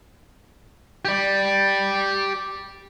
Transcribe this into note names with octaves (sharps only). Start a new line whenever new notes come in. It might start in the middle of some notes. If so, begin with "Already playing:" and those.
G4 D5